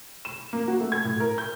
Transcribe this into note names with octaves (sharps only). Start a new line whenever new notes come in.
E7
A#3
F#4
A3
G#6
A2
A#4
G6